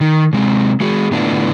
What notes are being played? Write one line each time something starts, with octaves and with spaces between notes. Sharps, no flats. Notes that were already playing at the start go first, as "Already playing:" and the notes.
D#3
C3 G#3 C4
G#3 F#4 G#4
A2 D3 B3 D4 E4 F4